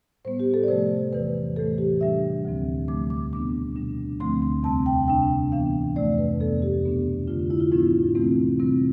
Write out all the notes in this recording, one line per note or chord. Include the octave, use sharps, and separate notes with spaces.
A2 G3 B3 C5
G4
A4
D5
C3 F3 A3 C5
E2 C3 E3 B4
A2 E3 A3 A4
G4
C3 G3 D4 E5
D2 D3 F3 C4
E2 D3 F3 A3 D6
D6
B2 G3 B3 D4 D6
B2 G3 D4
D2 D3 F3 A3 C4 C6
C6
E2 C3 G3 C4 A5
G5
C3 G3 D4 G5
A2 E3 B3 D4 F5
F2 C3 F3 A3 D5
B4
F2 C3 F3 B3 A4
G4
B2 B3 D4
F2 D3 A3 D4 F4
F4
E4
F4
A2 F3 B3 D4 E4
C3 E3 A3 C4
C3 G3 C4